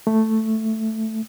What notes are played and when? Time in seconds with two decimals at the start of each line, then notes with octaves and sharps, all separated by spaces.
0.07 A3